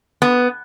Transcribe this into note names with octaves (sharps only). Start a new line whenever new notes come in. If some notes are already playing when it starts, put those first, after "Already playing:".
B3